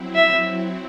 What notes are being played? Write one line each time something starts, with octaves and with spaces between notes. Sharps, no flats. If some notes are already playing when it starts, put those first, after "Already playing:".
Already playing: F#3 C4 E4
E5